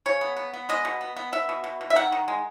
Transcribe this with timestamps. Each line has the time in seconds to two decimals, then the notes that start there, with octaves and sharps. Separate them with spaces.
0.06 C#3 C#5
0.21 B3
0.37 B3
0.54 B3
0.69 G#3 D#5
0.85 B2
1.01 B3
1.17 B3
1.32 B3 E5
1.49 B2
1.64 B2
1.81 B2
1.90 E5
1.95 D#3 F#5
2.12 D#3
2.28 G#3